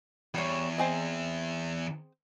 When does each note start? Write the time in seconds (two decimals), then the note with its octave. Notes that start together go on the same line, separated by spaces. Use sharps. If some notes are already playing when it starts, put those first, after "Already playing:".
0.34 E2 G3 C#5
0.78 C4 G#4 D#5